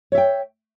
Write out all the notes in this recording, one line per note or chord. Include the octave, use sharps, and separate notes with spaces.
C#5 E5 G5